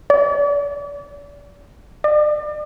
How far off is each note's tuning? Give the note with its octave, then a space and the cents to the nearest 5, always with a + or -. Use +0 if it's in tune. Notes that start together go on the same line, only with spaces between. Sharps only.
D5 -40
D5 +35